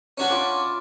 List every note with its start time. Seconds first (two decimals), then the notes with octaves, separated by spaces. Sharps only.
0.18 C#4 D4 F#4
0.30 F4 B5 D6